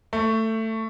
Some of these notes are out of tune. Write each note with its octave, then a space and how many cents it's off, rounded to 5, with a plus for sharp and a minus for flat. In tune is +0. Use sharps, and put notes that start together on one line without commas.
A3 +15